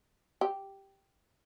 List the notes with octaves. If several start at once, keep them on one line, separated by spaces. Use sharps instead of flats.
G4